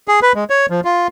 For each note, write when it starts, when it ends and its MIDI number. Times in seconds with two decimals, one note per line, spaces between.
0.08 0.20 68
0.23 0.33 71
0.35 0.44 56
0.50 0.66 73
0.70 0.80 53
0.85 1.07 65